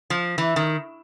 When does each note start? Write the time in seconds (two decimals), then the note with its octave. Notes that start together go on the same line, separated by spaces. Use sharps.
0.10 F3
0.38 E3
0.56 D#3